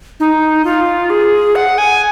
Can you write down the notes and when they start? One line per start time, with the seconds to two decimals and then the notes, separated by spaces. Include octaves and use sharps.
0.20 D#4
0.65 F4
1.10 G#4
1.55 F#5
1.78 G#5